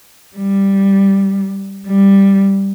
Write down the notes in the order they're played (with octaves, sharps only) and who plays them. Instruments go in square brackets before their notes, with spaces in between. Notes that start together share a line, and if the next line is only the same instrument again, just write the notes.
[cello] G3
G3